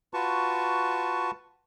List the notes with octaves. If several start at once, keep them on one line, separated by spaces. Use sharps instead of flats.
F4 F#4 B4 A5 C#6